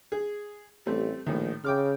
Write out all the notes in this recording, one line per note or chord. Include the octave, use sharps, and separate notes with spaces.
G#4
A1 G3 A3 C4
A#1 A2 D#3
C#3 G5 D6 F6